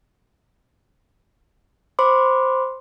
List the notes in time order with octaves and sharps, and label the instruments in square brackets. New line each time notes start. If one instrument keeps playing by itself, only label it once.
[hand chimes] C5 B5 C6 D6